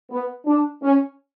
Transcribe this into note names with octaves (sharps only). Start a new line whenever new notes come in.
B3
D4
C#4